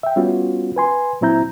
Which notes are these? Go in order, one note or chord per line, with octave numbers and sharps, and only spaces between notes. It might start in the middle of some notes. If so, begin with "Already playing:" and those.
E5 G5
G3 B3 C#4 F4 F#4
B4 G#5 C6
A#2 F#3 C4 E4 A#5 G6